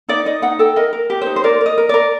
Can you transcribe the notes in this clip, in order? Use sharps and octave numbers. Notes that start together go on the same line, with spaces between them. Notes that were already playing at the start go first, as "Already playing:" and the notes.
D#4 D5
D#4 D#5
D#4 F#5
A4 G5
A#4 D#5
A#4
G4
D#4 C5
C5
A#4 D5
A#4
D#5
A#4
A#4 D5